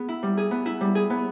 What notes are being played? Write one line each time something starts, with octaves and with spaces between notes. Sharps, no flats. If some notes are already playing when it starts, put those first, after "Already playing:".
Already playing: B3 G#4
E4
G3
G#4
B3
E4
G3
G#4
B3